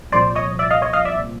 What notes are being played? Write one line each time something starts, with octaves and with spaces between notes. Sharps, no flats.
C2 A#2 F3 C5 D5
C#5 D#5
D5 E5
D#5 F5
C#5 D#5
D#5 F5
D5 E5